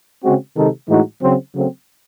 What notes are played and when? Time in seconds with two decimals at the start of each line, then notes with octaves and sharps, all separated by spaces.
0.23 C#3 G#3 C4 F#4
0.56 C3 D#3 G#3 D#4 A4
0.88 A2 E3 G#3 D#4 F#4
1.22 C#3 F#3 C4
1.54 C#3 F#3 A3 C4